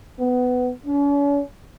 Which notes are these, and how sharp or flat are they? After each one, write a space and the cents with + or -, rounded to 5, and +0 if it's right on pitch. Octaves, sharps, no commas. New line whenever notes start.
B3 +15
C#4 +45